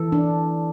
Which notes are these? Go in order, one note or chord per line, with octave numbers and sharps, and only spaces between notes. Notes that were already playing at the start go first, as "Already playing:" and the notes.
Already playing: E3 A4
D4